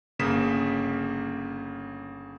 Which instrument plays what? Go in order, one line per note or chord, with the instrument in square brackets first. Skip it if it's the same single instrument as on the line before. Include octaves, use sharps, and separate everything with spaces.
[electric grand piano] G1 C#3 A#3 D#6 B6 E7